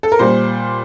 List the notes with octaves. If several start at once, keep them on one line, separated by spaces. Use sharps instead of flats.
A4
A#4
A#2 G3 C5